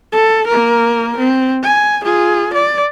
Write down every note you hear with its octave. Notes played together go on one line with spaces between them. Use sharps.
A4
A#3 A#4
C4
G#5
F4 G#4
D5